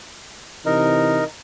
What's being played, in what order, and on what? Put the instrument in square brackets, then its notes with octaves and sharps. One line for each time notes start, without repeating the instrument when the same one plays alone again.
[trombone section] C3 E3 [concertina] D#4 A#4